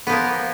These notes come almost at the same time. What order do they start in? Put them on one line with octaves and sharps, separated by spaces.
B3 F3 A#3